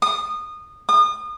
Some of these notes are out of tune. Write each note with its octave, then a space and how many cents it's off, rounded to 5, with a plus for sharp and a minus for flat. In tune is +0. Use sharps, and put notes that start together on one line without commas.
D#6 -20
D#6 -35